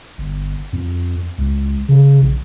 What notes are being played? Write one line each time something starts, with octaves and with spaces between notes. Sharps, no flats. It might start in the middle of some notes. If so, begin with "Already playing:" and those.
G1
F2
C#2
C#3
A#1